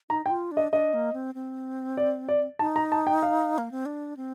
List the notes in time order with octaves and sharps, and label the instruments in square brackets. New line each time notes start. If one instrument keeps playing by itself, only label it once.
[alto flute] D#4 [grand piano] A#5
[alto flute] D#4 [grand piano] G5
[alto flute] F4
D4
[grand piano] D#5
[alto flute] D4 [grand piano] D#5
[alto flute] A#3
C4
C4
[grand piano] D5
D5
[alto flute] D#4 [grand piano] A5
[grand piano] A#5
A5
G5
F5
[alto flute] A#3
C4
D4
C4